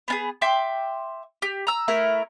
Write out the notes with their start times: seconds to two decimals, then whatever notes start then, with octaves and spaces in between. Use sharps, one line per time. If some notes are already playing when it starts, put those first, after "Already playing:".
0.08 B3 D4 G#4
0.41 E5 G5 C6 D6
1.42 G4
1.67 A#5 E6
1.88 A3 E4 A#4